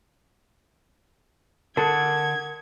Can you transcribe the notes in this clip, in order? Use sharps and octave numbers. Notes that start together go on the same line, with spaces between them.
D3 D4 A4 A#4 F#5 G#6